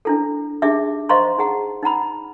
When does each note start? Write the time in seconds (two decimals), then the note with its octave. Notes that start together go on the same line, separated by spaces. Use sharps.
0.05 D4 E4 A4
0.62 D4 D#4 G4 G#4 E5 D6
1.09 C5 D#5 F5 A#5 C6 C#6
1.38 D#4 G#4 F#5 A#5
1.83 D#4 F#5 A#5 B5